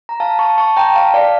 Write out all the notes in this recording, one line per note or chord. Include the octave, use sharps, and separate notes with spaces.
A#5
F5 A5
A5 C#6
A5 C#6
G5 A#5
F5 A5
D5 F5